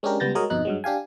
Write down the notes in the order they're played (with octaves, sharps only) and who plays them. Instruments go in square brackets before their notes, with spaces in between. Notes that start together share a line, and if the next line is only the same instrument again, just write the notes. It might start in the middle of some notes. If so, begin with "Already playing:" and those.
[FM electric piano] G#3 C#4 D4 G4 A#4
C#2 G3 B3 G6 A6 A#6
G#3 F#4 A#4 C#5 D#5
G1 F2 B2 D#4 F#6
G2 F#3 G#3
D4 G4 F5 G#5